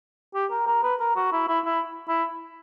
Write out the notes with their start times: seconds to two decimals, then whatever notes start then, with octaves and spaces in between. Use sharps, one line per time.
0.34 G4
0.51 A#4
0.66 A#4
0.83 B4
1.00 A#4
1.16 F#4
1.32 E4
1.48 E4
1.65 E4
2.08 E4